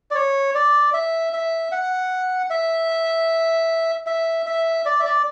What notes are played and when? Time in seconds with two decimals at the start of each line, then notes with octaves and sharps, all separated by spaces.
0.11 D5
0.15 C#5
0.55 D5
0.94 E5
1.33 E5
1.72 F#5
2.50 E5
4.07 E5
4.46 E5
4.86 D5
5.00 E5
5.05 D5